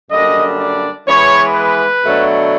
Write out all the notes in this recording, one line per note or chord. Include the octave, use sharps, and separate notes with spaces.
F#2 D3 G3 A#3 D4 D#5
D5
E3 G#3 B3 C#5
B4
B2 F#3 A3 D4